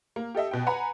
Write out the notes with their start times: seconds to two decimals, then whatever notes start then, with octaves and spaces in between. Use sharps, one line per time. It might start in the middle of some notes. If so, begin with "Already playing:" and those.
0.16 A#3
0.35 G4 A4 D#5 E5
0.51 B2 G5
0.66 B4 F#5 G#5 A#5 B5